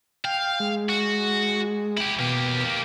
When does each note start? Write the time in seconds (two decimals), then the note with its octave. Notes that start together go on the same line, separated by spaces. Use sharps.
0.25 F5 G5
0.60 G#3
0.89 F#4
1.97 E4 G4
2.19 B2 A#3 G4